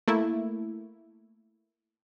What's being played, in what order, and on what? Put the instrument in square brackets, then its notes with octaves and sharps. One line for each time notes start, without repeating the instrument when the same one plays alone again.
[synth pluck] A3 A#3 E4